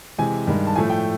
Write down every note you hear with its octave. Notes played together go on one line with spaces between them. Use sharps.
C3 E3 G#3 G#5
G2 D#3 G#3
A5
A2 F3 A3 G#5
G5